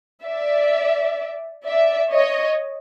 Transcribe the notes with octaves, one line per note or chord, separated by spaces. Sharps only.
D5 E5
D5 E5
C#5 D#5